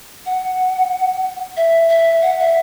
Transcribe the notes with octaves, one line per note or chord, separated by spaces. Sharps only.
F#5
E5
E5
F#5
E5